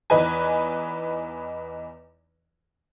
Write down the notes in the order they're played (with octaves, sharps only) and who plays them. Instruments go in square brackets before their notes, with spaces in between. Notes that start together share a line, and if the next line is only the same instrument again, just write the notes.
[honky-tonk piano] E2 E3 D#4 B4 D#5 G#5